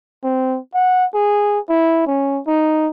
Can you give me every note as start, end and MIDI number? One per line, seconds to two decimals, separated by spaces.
0.24 0.59 60
0.75 1.05 78
1.14 1.59 68
1.69 2.03 64
2.07 2.41 61
2.47 2.90 63